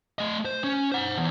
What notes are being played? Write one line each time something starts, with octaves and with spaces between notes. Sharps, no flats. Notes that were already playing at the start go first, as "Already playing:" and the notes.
A3 D#5
C5
C#4
C5 F#5
E2